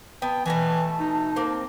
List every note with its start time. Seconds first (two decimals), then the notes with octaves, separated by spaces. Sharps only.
0.22 B3 G5 A5
0.46 B2 E3 A3 G#5 A5
1.00 D#4
1.36 A#3 C4